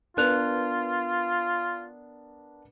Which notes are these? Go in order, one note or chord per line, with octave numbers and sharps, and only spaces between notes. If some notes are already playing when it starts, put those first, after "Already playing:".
B3 D4 F4 A#4 B4 F#6 F7